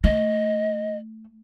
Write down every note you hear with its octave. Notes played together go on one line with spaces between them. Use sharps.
A3 D#5